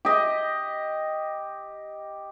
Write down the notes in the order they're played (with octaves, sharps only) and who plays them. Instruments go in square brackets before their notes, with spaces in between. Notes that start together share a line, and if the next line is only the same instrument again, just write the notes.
[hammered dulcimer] G4 D#5